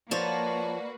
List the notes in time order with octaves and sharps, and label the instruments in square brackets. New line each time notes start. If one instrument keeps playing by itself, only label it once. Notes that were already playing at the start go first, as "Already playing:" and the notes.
[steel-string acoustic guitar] F3 C#5 A5 [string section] A#3 F#4 B4 [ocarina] D5